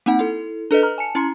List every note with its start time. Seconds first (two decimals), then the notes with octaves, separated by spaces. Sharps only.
0.06 A#3 C4 D#4 F#5
0.19 E4 A4
0.71 D4 A4 B4 D#5
0.83 A#5 F6
0.98 G#5 A5 C#7
1.15 C#4 E4 A#5 C6 C#7